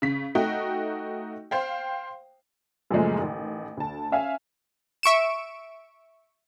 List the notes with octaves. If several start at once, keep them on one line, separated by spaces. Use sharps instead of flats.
C#3 B6
A3 D#4 F#4 G5
C5 F5 G5
F#2 A#2 C#3 F3 G#3 A3
A1 D#3
D2 A5
C#4 E5 F5 G#5
E5 C#6 D7 E7